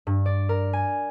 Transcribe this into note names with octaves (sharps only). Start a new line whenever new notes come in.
G2
D5
A#4
G#5